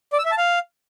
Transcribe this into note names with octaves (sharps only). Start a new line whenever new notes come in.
D5
E6
E5
A5
F5